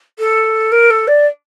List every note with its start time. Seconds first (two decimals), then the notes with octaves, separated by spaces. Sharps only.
0.19 A4
0.72 A#4
0.90 A4
1.07 D5